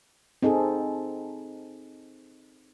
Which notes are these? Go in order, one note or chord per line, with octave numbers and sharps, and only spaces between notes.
C4 D#4 G#4 A4